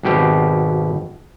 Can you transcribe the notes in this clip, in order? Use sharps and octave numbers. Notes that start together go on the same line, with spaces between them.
G#1 B2 G4